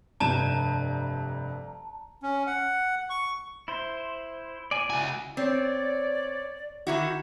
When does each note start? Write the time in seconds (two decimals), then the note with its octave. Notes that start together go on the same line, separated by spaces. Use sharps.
0.20 F1 G2 A5 A#5 E7
2.23 C#4
2.47 F#5
3.10 C#6
3.68 E4 C5
4.71 D5 G#5
4.90 C#2 E4 F#4 G#5
5.37 C4 C#5 D5
6.87 D#3 E4 F#4